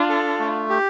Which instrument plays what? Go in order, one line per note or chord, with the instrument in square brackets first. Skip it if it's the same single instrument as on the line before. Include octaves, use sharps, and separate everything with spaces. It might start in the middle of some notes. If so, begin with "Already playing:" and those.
Already playing: [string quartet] D4 F4
[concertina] A4
A3
G4